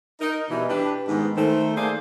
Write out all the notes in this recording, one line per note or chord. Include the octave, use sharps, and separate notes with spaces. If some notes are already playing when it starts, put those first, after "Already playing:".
D#4 A#4
B2 E3 G3
D4 G4 B4
G#2 D#3 B3
D#3 A3 C5
A3 A#3 G#4 C5 D5 F5